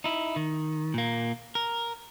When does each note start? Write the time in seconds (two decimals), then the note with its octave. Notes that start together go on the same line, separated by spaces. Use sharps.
0.04 D#4 E4
0.36 D#3
0.94 A#2 A#3
1.55 A#4